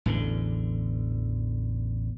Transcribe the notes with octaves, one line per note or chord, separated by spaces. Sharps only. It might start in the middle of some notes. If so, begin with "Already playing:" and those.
A1 E2 D3